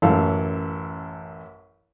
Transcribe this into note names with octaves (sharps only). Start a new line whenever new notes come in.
A1 F#2 A4 F5